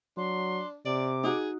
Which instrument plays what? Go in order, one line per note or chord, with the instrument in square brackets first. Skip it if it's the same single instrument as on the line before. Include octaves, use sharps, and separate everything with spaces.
[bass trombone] F#3 [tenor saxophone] D4 [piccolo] C6
[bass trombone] C3 [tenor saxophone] D5 [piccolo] D6
[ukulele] D#4 F#4 [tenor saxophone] G#4